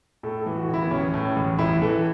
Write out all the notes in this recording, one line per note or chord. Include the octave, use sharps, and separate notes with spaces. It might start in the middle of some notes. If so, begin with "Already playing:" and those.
A2 A4
A4
E3
F#4
A1 E4
B3
A1 C#4
A2
C#4
A1
A1 E4
E3 A4